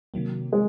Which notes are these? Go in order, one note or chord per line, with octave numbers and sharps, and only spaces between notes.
C3 D#3 F#3 A#3
G#3